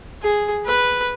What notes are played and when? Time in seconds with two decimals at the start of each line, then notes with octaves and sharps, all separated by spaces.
0.22 G#4
0.66 B4